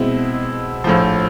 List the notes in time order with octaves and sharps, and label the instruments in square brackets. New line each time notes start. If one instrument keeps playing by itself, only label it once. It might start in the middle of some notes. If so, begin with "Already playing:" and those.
Already playing: [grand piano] B2 G#3 C4 E4
A#1 A2 F3